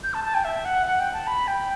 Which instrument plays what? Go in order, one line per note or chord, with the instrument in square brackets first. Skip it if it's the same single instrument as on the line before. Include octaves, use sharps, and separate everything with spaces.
[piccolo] G6
A5
A5
G5
E5
F#5
F#5
G5
A5
B5
G5